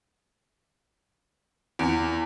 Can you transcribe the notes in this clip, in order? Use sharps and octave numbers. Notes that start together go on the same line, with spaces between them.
E2